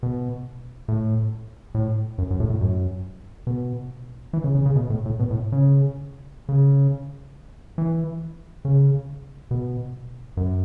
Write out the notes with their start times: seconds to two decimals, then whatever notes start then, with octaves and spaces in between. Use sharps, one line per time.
0.03 B2
0.88 A2
1.75 A2
2.18 F#2
2.31 F#2
2.40 A2
2.50 A2
2.61 F#2
3.47 B2
4.33 E3
4.44 C#3
4.55 C#3
4.66 C#3
4.76 B2
4.90 A2
5.06 A2
5.19 B2
5.31 A2
5.52 C#3
6.49 C#3
7.78 E3
8.65 C#3
9.51 B2
10.37 F#2